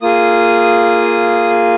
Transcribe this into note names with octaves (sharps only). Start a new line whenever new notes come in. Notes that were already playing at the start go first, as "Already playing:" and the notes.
A#3 F4 G#4 D#6